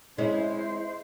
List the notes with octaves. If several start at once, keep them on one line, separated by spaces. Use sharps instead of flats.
G#3 C4 C#4 E4 C5